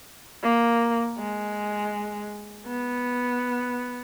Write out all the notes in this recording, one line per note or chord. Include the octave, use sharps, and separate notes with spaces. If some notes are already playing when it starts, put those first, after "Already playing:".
A#3
G#3
B3